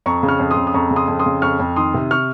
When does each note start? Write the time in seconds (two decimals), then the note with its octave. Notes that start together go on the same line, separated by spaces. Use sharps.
0.06 F2 A#5 C#6
0.23 C#3
0.28 C#6 F6
0.40 F2
0.51 C6 D#6
0.56 C#3
0.67 D#6
0.74 F2 A#5 C#6
0.91 C#3
0.96 C6 D#6
1.08 F2
1.19 C6 D#6
1.26 C#3
1.42 F2 C#6 F6
1.59 F2
1.76 D#3 C6 D#6
1.94 C3
2.11 C#6 F6